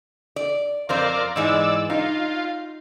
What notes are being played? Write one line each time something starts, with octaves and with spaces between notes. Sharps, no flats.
D5
F2 C4 A#4 C5 D5 F5
G#2 E3 G#3 D5 E6
D#4 F4